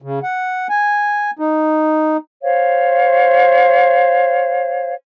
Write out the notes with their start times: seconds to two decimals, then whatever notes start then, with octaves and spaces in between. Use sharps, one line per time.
0.02 C#3
0.23 F#5
0.69 G#5
1.39 D#4
2.43 C5 C#5 F5